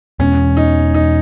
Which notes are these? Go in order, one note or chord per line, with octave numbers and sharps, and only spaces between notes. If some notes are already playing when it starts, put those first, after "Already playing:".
E2 B2 G#3 B3 C#4
D#4
D#4